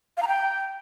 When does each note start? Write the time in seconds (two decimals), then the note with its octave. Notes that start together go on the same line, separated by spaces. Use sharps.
0.17 F5
0.22 A#5
0.28 G5